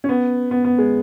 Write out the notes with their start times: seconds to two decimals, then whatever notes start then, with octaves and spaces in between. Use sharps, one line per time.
0.04 C#4
0.09 B3
0.51 B3
0.64 B3
0.78 G#3